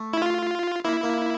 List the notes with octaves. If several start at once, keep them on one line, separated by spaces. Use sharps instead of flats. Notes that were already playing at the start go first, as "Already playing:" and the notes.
Already playing: A3
E4
F4
A#3 E4
A#3